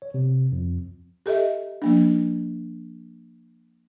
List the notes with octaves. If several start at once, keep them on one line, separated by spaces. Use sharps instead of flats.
C#5
C3
F2
G4 A4 D#5 E5
F3 A#3 D4